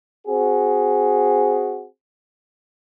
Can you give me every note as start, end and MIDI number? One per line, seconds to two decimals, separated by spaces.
0.28 1.85 60
0.28 1.85 66
0.28 1.85 68